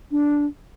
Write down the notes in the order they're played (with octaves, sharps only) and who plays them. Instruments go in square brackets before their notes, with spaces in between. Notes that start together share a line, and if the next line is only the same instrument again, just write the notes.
[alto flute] D4